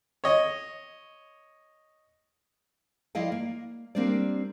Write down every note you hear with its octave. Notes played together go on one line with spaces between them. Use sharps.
C#5 D#5
F3 E4 D5 D#5 F5 G5
A#3
G3 A#3 C4 D4 A#4 D5